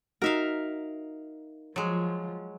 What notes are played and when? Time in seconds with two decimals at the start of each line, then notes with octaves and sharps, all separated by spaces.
0.22 D#4 F#4 A#4 E5 F5
1.76 F3 F#3 G#3